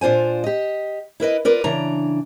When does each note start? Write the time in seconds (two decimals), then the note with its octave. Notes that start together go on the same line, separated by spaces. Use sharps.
0.01 A#2 D4 F4 C5 G#5
0.44 G4 D#5
1.20 E4 A#4 B4 D#5
1.45 F4 A#4 B4 D5
1.64 C#3 E3 D4 A#5